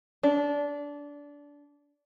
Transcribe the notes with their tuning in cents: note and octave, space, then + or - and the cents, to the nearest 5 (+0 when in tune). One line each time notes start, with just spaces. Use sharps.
D4 -20